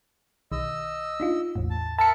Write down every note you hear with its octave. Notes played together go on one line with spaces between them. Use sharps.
B1 D#3 D#5 E6
D4 D#4 F4
A1 E2 A2
A5
A#4 E5 A5 B5 C#7